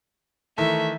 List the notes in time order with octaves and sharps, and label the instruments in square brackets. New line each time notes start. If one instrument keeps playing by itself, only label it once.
[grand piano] D#3 E3 A4 [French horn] A3 [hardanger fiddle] E5